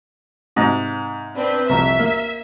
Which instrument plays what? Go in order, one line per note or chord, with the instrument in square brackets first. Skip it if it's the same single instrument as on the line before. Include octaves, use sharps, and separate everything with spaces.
[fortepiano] G#2 C3
[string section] C4 D4 B4
[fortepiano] C2 F2 A#5 [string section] E5
[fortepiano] A#3